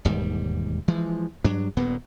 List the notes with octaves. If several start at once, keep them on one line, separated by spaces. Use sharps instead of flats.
E1 D#2 G#2 G3
E3 F3 G#3
G2 F#3 D4
D#1 G2 A#2 B3